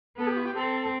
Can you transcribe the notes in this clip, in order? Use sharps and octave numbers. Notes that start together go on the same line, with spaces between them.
B3 A4
G4
E4
G4
C4 A4